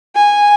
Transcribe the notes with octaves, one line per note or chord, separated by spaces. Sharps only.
G#5